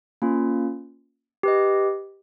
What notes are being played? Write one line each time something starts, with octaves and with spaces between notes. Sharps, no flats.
A#3 C#4 F4
G4 B4 D#5